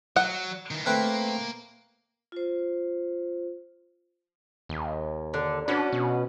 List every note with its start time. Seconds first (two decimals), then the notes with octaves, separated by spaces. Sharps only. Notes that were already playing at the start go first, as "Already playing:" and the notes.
0.16 F#3 F#5
0.71 D#3 E3
0.86 A3 A#3 C4 B4
2.32 F4 C5
4.69 D#2
5.34 D3
5.68 C#4 D4 F#4 B4
5.93 B2